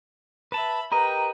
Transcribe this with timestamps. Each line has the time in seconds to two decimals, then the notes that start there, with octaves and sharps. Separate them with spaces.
0.52 B4 E5 A5 B5
0.92 G4 A#4 B4 D#5 G5 A#5